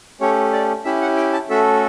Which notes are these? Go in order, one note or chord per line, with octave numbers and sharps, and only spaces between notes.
A3 C#4 G4 C#5
D5
C#4 E4 G4 E5
F#5
G5
A5
A3 C#4 F#4 A4 E5